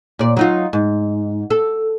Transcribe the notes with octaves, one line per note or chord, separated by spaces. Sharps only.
A#2 D5
F#3 D#4 F4
G#2
A4